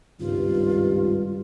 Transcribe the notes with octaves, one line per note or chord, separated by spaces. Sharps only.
G#1 C#2 G2 F4